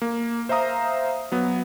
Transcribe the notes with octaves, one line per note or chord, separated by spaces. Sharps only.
A#3
C5 E5 F5 A#5 D#6
F#3 B3